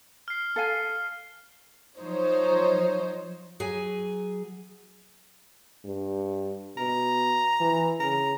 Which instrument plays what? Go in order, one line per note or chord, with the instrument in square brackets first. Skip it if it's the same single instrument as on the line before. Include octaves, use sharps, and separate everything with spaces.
[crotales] F6 C7
[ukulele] A4 F5 G#5
[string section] F3 F#3 D#4 C5 C#5
[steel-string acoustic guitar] F#3 G#4 G#5
[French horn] G2
[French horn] B2 [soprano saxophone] A#5
[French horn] E3
[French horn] C#3 [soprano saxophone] A#5